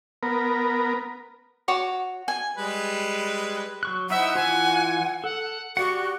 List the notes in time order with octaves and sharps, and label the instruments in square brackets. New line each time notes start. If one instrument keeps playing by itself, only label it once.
[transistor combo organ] B3 A#4
[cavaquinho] F#4 C#5 D6
G#5
[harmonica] G3 G#3 B4
[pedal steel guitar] F#3 C#6 F#6
[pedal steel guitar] D#4 E4 C5 [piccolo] E5 [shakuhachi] F#5
[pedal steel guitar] E3 F4 [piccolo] G#5
[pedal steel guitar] A4 [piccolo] F#5
[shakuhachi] F#4 [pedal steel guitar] G4 D5 F#5 [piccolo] C#6